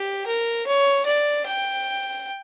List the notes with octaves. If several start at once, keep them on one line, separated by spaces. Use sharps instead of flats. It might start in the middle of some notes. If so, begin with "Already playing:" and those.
Already playing: G4
A#4
C#5
D5
G5